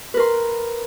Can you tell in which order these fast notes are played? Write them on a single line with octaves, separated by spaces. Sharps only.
B4 A#4 C6